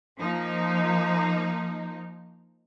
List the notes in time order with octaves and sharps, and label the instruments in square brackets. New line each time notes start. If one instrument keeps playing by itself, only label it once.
[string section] F3 A#3 D#4